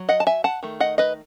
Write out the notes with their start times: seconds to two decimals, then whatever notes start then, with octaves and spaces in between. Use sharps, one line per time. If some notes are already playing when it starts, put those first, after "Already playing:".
Already playing: F#3
0.09 D#5 F#5
0.20 A5
0.27 E5 G#5
0.44 F#5 A5
0.63 D#3 A3
0.80 D#5 F#5
0.98 B4 D#5